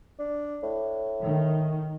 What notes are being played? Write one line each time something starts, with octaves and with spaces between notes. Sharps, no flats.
D4
A2
D#3